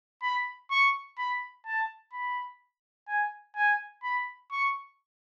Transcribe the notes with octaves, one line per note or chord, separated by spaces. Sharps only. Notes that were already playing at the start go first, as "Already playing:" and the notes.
B5
C#6
B5
A5
B5
G#5
G#5
B5
C#6